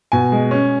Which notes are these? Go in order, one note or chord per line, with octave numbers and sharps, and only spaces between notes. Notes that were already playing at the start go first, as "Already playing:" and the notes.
B2 G#5
G#3
C#4